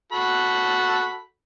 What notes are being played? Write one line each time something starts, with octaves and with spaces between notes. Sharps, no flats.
F#4 A4 B5